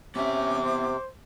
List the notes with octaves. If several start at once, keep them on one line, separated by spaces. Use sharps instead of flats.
C3 B3 C#4 E5 D6
C5